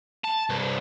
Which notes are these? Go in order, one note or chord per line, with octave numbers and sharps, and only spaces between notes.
A5
C2 G2